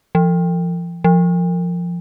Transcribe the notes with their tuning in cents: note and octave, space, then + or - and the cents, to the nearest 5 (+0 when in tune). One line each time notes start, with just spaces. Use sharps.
F3 -35
F3 -10